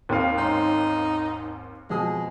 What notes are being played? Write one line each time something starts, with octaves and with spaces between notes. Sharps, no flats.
D#2 C4 F5
G#2 C#4 D#4 C6
F2 B2 G#3 D#6